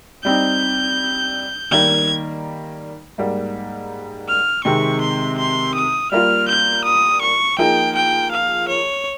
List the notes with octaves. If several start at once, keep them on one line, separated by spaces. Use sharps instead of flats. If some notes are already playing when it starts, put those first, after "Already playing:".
G3 C4 D#4 G6
D#3 G3 A#3 G#6
G#2 G3 A#3
F6
C3 D#3 G#3 C4 C#6
C6
C6
D#6
G3 A#3 F4 F6
G6
D#6
C#6
F3 A#3 D#4 G#4 G5
G5
F5
C#5